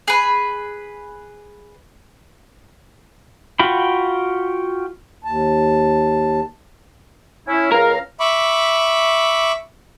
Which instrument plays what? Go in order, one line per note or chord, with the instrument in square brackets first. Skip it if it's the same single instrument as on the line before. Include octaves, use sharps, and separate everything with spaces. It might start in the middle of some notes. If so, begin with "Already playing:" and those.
[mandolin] G#4 B4
[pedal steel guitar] F4 F#4 G5 B5
[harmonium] D#2 A5
[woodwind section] C#4 E4
[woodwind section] C#2 F5 A#5 [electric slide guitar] A#4
[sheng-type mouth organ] E5 B5 C#6 D6